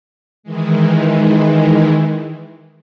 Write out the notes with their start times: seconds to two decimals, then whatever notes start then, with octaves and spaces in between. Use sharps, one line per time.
0.43 D#3 E3 G#3